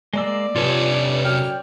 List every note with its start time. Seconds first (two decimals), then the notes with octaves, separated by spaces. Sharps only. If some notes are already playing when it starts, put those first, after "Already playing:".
0.13 G#3 A#3 D5 E6
0.56 G2 C3 F4 A4 C#5 G#5
0.92 C#5
1.24 F#2 G5 F6